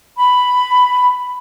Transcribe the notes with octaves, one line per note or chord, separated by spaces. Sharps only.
B5